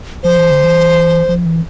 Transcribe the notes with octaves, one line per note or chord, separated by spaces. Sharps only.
F3 C5
E3
D3
E3
F3
E3